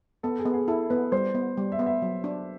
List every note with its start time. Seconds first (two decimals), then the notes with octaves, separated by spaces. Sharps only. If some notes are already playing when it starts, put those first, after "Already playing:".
0.23 B3 A4
0.39 G#4
0.46 B3
0.54 G#4
0.68 E4 A4
0.90 B3 B4
1.12 G3 C5
1.35 B3
1.57 G3
1.72 E5
1.79 B3
1.86 E5
2.02 F#3
2.24 D4